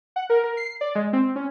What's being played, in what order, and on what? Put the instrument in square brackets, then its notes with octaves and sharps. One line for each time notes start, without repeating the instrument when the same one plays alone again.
[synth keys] F#5
A#4
A#4
C7
D5
G#3
C4
C#4